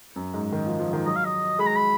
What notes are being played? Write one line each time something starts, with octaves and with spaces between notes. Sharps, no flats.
F#2
G#2
D#3
F3
F3
D#3
F#3 D#5
F5
D#5
G#3 B5
A#5
B5